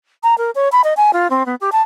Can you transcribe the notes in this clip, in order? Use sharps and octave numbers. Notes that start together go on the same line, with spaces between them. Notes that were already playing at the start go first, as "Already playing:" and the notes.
A#5
A#4
C#5
B5
D#5
G#5
F4
C4
B3
G4
A5